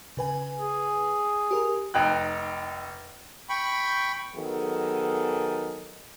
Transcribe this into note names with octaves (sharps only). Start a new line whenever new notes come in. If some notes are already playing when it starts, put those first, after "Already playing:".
C#3 B4 G#5
G#4
G4 A#4
F1 D#4 G5 F#6
G5 B5 C#6
D#3 F#3 B3 G#4 A4